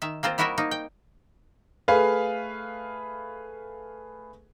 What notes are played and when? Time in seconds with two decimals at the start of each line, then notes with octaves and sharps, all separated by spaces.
0.02 D#3 E5
0.23 A#3 C4 F4 C5
0.38 G3 E4 F#4 A#4 D#5 E5
0.58 A#3 D#4
0.71 G5
1.88 A3 G#4 B4 F5